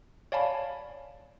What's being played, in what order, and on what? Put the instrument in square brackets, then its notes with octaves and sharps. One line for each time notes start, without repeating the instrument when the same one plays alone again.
[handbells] C#5 D5 F5 G#5 A5 B5